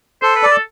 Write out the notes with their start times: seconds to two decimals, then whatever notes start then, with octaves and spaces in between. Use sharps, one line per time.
0.22 A4 C5
0.36 B4
0.43 D5
0.51 A4